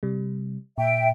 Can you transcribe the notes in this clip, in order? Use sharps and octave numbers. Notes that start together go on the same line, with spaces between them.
C3 G3
A#2 E5 G5